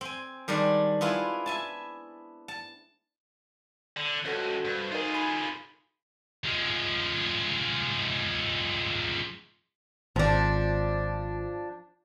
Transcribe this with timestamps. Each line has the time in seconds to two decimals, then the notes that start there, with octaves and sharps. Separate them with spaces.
0.01 C4 G#5
0.48 D#3 G3 G#3 D4
1.01 B3 E4 F4 G#4
1.46 E5 G#5 A5
2.48 A5
3.97 D3
4.26 C#2 F#4 A4 C5
4.65 G2
4.91 D#4 F4 G#4 A#4
5.14 G#5 B5
6.45 F3 G#3
10.16 G#1 F3 D4